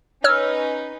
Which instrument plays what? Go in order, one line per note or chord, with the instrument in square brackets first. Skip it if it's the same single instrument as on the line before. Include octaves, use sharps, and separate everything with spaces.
[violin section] C#4 D#4 B4 [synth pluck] C#5 E6 F6